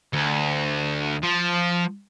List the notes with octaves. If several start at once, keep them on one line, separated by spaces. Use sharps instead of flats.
D2
F3